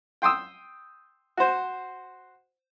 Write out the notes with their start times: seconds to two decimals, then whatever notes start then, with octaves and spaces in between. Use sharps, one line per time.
0.22 G5 C6 D#6 E6
1.37 F#4 C5